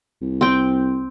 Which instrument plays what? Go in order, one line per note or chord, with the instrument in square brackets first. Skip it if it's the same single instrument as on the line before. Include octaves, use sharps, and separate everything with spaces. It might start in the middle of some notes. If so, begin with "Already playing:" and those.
[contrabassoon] C2
[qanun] C4 G5